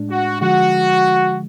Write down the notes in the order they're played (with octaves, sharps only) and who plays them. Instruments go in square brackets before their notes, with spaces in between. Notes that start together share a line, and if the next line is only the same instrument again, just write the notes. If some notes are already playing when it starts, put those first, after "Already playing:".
Already playing: [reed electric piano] A2 G#3 D4
[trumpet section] F#4
[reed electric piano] D3 F3 G#3 [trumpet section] F#4